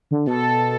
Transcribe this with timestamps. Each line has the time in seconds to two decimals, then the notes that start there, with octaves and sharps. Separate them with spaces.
0.11 D3
0.27 B2 A4